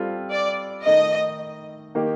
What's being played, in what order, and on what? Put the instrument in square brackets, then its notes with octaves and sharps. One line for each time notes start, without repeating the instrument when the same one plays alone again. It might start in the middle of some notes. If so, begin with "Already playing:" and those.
Already playing: [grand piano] G3 C4 F4 A4
[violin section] D5
[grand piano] D#3 A3 D#4 A4 [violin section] D#5
[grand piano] D#3 A#3 D#4 G4